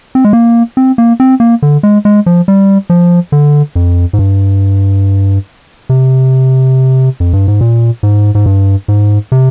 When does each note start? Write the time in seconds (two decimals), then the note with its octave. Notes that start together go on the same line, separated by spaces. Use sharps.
0.15 C4
0.25 G#3
0.33 A#3
0.77 C4
0.98 A#3
1.20 C4
1.40 A#3
1.62 D3
1.83 G#3
2.05 G#3
2.26 F3
2.48 G3
2.90 F3
3.32 D3
3.75 F2
4.13 G#2
4.19 G2
5.89 C3
7.20 F2
7.33 G2
7.48 G#2
7.61 A#2
8.03 G#2
8.35 G#2
8.46 G2
8.88 G#2
9.32 C3